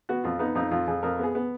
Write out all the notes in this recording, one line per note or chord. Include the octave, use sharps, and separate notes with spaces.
B3 F#4
F2 F4
B3 D#4
F2 D#4
F2 F4
F2 G#4
F2 A#4
B3 G#4
B3